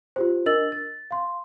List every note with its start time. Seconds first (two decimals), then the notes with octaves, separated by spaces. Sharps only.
0.16 F4 G4 C5
0.46 D4 A#4 D#5 E6 A6 F#7
0.72 A6
1.11 F5 C6